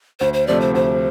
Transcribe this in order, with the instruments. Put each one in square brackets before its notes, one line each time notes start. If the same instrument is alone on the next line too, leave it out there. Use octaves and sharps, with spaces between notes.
[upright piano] D2 [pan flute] C5
[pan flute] C5
[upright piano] C3 F3 A3 [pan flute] D5
[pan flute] C5
[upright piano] D2 [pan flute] C5